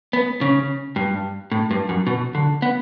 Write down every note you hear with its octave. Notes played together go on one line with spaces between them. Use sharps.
B3
C#3
G2
A2
G2
F#2
B2
D3
B3